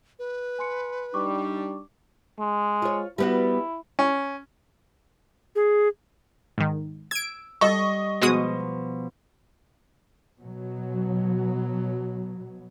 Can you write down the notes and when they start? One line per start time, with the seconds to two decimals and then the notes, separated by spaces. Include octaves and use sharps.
0.19 B4
0.59 G#5 C6 C#7
1.14 G3 D4 D#4 C#6 D6
2.39 G#3
2.82 F4 C#5
3.18 G3 B3 E4 F#4
3.99 C#4
5.55 G#4
6.58 G#2 D#3
7.11 E6 G#6 D7
7.61 G3 A4 D#5 C#6
8.22 B2 F3 G#3 F#4 D#6
10.39 B2 F#3